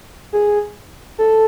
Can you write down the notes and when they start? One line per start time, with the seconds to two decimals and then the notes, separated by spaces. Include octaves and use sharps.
0.33 G#4
1.18 A4